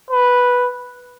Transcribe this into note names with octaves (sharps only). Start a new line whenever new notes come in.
B4